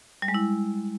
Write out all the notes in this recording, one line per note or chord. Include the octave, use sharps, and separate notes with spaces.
G3
G#3
E4